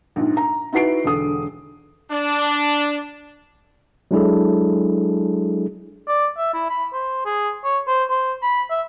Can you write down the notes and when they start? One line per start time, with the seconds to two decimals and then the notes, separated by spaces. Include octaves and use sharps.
0.16 A#1 G#2
0.37 A#5
0.73 D#4 E4 F#4 B4 C7 D7
1.04 E1 D3 D#6
2.11 D4
4.11 F#3 G#3 D4 E4 G#4 A4
6.08 D5
6.38 E5
6.53 E4
6.70 B5
6.93 C5
7.25 G#4
7.64 C#5
7.88 C5
8.10 C5
8.43 B5
8.70 E5